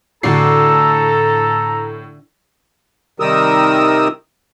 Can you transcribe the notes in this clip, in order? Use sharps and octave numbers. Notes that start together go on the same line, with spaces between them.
A2 D3 F#4 A4 D5 A#5 C7
C3 D#3 G3 A#4 D#6 E6